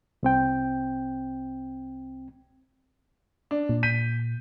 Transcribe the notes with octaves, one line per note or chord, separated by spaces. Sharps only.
C2 C4 G5
D4
A#2
G6 B6 D#7